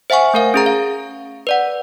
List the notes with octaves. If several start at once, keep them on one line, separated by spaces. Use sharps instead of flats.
C5 E5 F#5 G#5 C#6
A3 A#4 F5
C#4 G#4 A#5
F5
B4 D5 F#5